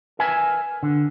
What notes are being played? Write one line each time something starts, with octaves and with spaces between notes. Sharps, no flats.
A#4 B4 E5 G#5
D3